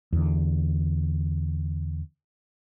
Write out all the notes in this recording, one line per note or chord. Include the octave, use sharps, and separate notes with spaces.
E2 D3